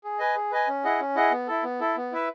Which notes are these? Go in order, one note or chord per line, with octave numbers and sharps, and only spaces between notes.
G#4
B4 D#5 G#5
G#4
B4 D#5 G#5
C#4
E4 G#4 D#5 F#5
C#4
E4 G#4 D#5 F#5
B3
E4 A4
B3
E4 A4
B3
E4 B4 E5